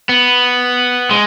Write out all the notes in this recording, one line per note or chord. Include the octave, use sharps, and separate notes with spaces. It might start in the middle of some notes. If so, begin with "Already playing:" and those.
B3
G#3